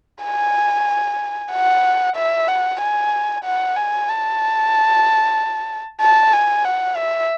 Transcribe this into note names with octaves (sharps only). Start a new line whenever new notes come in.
G#5
F#5
E5
F#5
G#5
F#5
G#5
A5
A5
G#5
F#5
E5